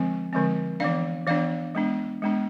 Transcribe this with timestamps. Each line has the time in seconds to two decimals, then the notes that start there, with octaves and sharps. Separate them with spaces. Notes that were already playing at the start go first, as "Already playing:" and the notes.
Already playing: D3 F3 G#3 C4
0.33 D3 F3 G#3 C4
0.80 E3 B3 D4 D5 F5
1.27 E3 B3 D4 D5 F5
1.75 G#3 B3 D4
2.22 G#3 B3 D4